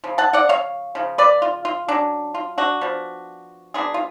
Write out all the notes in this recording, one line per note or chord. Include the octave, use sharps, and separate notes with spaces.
C#3 F3
F#5 A5
D5 F#5
C#5 F5
C#3 F3
B4 D5
F4
F4
F#3 C#4 D4
F4
D4 F#4
F3 B3 D4
F#3 B3 D4 F4 G#4
F4